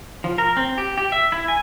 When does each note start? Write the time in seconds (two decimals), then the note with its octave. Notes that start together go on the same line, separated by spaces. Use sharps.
0.24 F3
0.38 A#4
0.57 C4
0.78 G4
0.98 G4
1.12 E5
1.32 E4
1.48 G#5